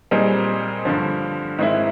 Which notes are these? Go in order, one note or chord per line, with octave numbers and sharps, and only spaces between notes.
A#2 G3 C4 D#4 G#4
G2 D3 F3
G#2 D#3 G#3 C4 E4